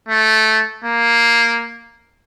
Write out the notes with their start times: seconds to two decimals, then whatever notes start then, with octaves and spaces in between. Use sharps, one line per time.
0.08 A3
0.84 A#3